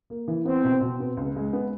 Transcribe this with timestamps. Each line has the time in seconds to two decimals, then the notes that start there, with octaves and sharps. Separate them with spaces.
0.10 A#3
0.28 E3
0.45 B3 C4
0.64 B2
0.81 B2
1.00 B3
1.17 C#2
1.36 G#3
1.53 B3